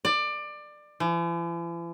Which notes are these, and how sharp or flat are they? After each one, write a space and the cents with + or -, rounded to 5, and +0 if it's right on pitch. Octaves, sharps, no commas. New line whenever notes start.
D5 +20
E3 +45